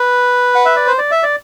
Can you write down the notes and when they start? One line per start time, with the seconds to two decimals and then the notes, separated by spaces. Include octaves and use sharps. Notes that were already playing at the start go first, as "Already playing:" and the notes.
Already playing: B4
0.55 F#5
0.65 E5
0.76 D5
0.87 C5
0.99 D5
1.11 E5
1.23 D5